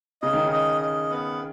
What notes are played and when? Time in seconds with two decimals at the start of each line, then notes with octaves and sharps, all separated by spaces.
0.22 C#3 D#5
0.33 D#3
0.45 C#3
0.52 D#5
0.81 D#5
1.10 B3